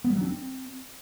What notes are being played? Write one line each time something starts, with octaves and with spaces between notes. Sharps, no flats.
B3
G3
F#3
D4
C4